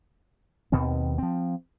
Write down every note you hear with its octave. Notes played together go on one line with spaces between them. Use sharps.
D#2 B2 D#3 C4
F3 C4